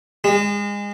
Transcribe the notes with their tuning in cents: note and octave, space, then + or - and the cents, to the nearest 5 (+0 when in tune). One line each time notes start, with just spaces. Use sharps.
G#3 -30